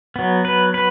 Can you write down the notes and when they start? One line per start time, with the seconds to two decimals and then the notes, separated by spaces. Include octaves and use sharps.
0.16 F#3 B3
0.45 B4
0.74 B4